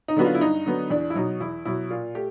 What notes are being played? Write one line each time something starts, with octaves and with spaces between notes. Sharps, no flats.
D#4
D3 F#3 B3 F#4
F4
E4
G2 D#4
D3 F#3 B3
E2 D4
E4
B2 F#3 D#4
E2 E4
B2 F#3 E4
A#2 F4
A3 G4